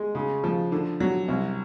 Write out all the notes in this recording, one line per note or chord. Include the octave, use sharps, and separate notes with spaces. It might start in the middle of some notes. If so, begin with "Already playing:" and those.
Already playing: G#3
C#3
F3
D3
F#3
C2